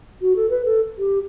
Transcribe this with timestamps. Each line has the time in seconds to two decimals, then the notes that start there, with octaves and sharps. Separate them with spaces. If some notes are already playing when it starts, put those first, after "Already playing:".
0.21 F#4
0.36 A4
0.50 B4
0.65 A4
0.98 G4